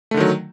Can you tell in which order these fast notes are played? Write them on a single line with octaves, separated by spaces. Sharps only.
A3 D3 D#3 F#3